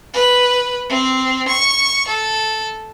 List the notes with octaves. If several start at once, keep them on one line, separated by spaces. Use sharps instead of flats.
B4
C4
C#6
A4